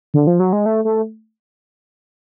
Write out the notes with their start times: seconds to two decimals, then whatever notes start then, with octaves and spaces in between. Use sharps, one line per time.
0.14 D3
0.27 F3
0.40 F#3
0.53 G#3
0.66 A3
0.85 A3